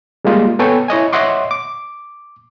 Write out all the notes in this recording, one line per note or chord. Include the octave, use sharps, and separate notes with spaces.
G3 G#3 A#3 F4 D#5
B3 A4 C#5 G5 G#5
E4 C#5 D#5 G#5
C#5 D#5 E5 F#5 C6 D6
D6